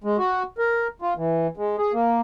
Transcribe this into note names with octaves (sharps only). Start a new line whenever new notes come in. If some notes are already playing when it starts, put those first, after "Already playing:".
G#3
F#4
A#4
F4
E3
G#3
G#4
A#3